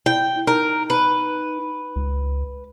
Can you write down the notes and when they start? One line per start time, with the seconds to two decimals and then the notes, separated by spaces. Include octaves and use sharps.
0.06 E4 G5
0.47 D#4 A#4
0.90 B4
1.96 C#2